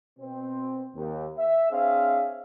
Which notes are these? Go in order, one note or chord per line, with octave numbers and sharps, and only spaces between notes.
B2 C4
D#2
E5
C4 D4 G#4 C#5 E5 F5